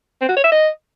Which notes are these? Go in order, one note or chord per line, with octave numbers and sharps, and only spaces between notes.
C4
F#4
C#5
E5
D#5